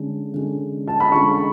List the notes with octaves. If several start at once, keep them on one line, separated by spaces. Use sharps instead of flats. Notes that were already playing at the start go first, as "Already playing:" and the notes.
Already playing: D3 G#3 C#4
D3 G#3 C#4
A5
B5
D3 G#3 C#4 C#6